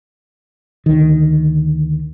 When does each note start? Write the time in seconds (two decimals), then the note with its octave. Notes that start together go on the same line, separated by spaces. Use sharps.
0.86 D2 D#3